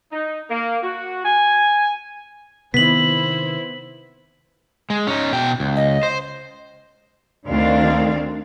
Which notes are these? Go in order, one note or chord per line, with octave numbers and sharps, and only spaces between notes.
D#4
A#3
F#4
G#5
C3 D#3 B3 E4 C5 B6 F#7
G#3
C#4 D#4
B2 G5
C#2
D#5
C5
D2 D#3 C4 D4 F5